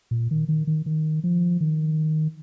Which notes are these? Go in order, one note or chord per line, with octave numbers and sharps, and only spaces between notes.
A#2
D#3
D#3
D#3
D#3
F3
D#3